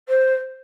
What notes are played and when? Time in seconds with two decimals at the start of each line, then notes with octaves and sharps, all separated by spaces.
0.09 C5